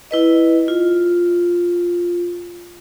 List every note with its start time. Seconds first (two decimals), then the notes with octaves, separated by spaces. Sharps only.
0.11 E4 B4 D#5
0.68 F4